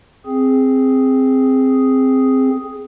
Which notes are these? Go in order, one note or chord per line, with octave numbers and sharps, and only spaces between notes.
C4 G#4